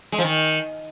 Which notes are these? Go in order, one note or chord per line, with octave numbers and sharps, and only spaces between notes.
G#3
F3
D#3